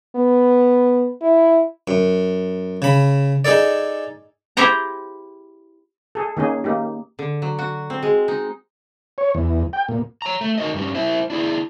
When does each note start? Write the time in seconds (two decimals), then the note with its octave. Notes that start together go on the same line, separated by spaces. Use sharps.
0.15 B3
1.22 E4
1.88 F#2
2.82 C#3 B5
3.45 D#4 G#4 A4 D5
4.57 E4 G4 G#4 C5 G5 A#5
6.15 G#4 A4
6.37 D#3 A#3 C#4 G#4
6.64 A#3 D#4 G4
7.19 D3
7.42 F#3
7.59 F#4
7.90 C4
8.03 G#3
8.28 D#4
9.18 C#5
9.35 E2
9.73 G5
9.88 A#2
10.22 C#5 A#5
10.41 A3
10.58 D#4 F#4 A#4 D5 D#5
10.74 G2 G3 C#4
10.95 E4 C5 E5
11.30 D4 E4 G#4